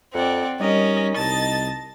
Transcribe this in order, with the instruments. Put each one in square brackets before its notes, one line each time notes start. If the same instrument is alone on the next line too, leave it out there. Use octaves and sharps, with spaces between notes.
[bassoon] F2 [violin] C4 [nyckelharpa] D5 F#5
[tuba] G3 [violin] C#4 [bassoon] D#4 [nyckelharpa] A#4 D#5
[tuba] C2 [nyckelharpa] D#5 A5 [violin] A6